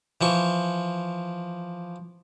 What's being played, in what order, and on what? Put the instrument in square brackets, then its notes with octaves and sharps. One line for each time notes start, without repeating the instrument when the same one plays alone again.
[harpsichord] E3 F3 C#6